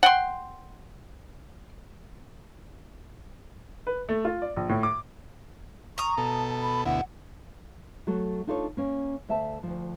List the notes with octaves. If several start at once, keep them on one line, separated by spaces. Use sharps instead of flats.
F#5 G5 C6
B4
A3
F4
D5
A#1
A2
D6
A#5 C#6 D#6
B2 A4 A5
B5
D2 B2 E4 F#5
F#3 A3 F#4 A4
D4 D#4 F4 A4 B4 C#5
A#3 C#4
D2 A3 E5 F5 A5
D2 F3